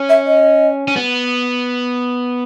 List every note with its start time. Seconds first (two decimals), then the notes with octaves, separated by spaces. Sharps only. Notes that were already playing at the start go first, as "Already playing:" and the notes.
Already playing: C#4
0.09 E5
0.27 D#5
0.88 C#4
0.96 B3